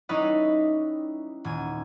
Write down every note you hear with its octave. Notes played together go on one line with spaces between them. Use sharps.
G3 C#4 D#4 E4 B4 D#5
D#1 G#5